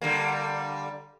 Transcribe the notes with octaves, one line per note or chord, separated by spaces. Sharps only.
D3 G3 A#3